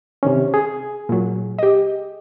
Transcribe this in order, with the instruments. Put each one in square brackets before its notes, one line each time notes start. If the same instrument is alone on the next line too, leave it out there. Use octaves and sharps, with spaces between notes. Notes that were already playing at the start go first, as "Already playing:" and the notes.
[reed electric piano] C3 D#3 C#4
G#4
[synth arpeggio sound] A#2 F#3
G4 D#5